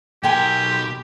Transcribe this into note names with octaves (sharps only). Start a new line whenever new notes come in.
B1 G4 A#4 G5 G#5 C6